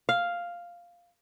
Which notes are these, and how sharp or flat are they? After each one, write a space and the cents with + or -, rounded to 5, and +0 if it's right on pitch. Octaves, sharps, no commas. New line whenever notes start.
F5 +0